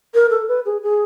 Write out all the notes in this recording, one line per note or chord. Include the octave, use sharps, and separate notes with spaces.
A#4
A4
B4
G#4
G#4